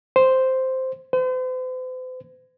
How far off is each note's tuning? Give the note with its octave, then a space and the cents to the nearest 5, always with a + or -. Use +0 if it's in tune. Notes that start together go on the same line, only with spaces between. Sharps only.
C5 -5
C5 -45